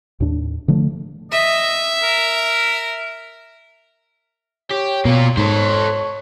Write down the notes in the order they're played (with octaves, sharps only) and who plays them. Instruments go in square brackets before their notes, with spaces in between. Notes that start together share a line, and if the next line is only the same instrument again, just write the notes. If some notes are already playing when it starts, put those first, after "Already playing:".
[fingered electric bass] D#2 A2 D4
D3 F3 A3
[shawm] D#5 [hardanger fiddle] E5
[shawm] A#4
[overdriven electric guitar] G4 [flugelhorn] C#5
[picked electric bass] B2 [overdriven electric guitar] A#3 F4
[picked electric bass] G#2 [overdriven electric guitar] A4 C5 [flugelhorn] C#5